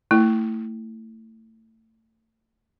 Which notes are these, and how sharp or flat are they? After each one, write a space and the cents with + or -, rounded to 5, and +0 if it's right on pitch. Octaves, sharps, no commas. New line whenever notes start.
A3 +30 E4 +0